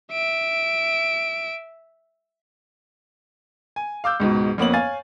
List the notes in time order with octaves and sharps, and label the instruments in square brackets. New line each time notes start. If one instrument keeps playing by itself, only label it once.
[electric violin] E5 D7
[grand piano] G#5
F5 D6 E6 G6
C#2 G#2 B2
F2 A#3 B3 C#4 F#7
C#5 F5 G#5 A6